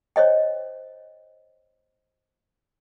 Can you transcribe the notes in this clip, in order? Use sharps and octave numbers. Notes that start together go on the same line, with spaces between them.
C5 C#5 D#5 G5